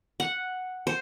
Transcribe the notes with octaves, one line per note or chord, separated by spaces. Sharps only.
F#5
C5